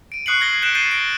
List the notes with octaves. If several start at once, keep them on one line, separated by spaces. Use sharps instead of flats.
D7 D#7
C#6 D#6 F#6 C7 C#7 F#7
F6 G#6 A#6 C7 G7
F#6 G6 B6 C7 D7 E7
G6 A6 C7 D7 D#7 G7
A#6 D7